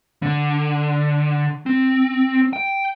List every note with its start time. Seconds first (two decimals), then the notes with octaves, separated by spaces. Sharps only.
0.22 D3
1.66 C4
2.53 G5